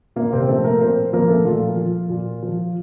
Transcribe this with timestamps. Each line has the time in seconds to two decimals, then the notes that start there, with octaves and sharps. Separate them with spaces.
0.16 A#2 A#3
0.33 C3 C4
0.48 F3 A3 A4
0.64 A#3 A#4
0.80 A#2 C4 C5
1.13 F3 A#3 A#4
1.29 A3 A4
1.45 A#2 F3 F4
1.77 F3
2.10 A#2
2.43 F3